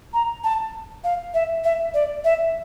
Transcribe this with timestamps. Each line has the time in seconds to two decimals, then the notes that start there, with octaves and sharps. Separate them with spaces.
0.13 A#5
0.43 A5
1.04 F5
1.33 E5
1.64 E5
1.94 D5
2.24 E5